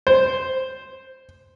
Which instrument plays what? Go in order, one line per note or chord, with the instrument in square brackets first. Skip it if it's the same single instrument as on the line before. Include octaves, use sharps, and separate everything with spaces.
[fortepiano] C5